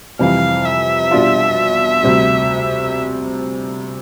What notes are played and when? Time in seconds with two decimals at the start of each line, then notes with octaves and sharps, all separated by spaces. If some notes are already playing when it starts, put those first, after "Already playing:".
0.19 F2 C3 E3 G3 F5
0.65 E5
1.11 B2 G3 D4 F4
2.03 D2 C3 G3